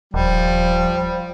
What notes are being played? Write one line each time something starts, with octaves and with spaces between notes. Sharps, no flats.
D#1 F3 G3